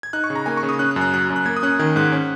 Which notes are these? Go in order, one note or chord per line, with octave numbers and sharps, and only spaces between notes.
G#6
D#4 F#6
C#6
C#3
A#5
A#3 G#5
C#6
C#3
D#6
C#4 F#6
F#6
F#2
F#6
F#3 F#6
F#2
F#6
A#3 G#6
D#6
C#4 F#6
D#3 G#6
G#2 F#6
C#4